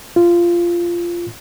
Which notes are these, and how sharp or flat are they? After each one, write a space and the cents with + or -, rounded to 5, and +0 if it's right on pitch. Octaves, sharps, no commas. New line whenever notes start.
F4 -15